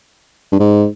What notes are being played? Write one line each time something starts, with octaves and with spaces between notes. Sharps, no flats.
G2
G#2